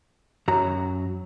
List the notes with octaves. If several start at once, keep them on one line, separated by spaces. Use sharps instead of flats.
F#2 F#3 A#5